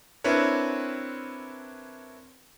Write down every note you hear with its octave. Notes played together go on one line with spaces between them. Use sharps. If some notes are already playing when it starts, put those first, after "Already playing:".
C4 D4 E4 A#4 B4 C#5